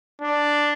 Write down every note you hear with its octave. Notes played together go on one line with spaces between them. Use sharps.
D4